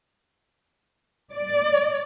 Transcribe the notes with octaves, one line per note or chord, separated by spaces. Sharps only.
D5